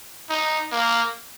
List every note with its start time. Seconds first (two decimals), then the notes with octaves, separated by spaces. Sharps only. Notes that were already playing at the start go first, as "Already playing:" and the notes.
0.30 D#4
0.72 A#3